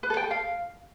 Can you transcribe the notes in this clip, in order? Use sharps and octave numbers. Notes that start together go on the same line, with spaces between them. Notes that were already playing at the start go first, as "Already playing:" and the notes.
B4
A4
G5
A4
F5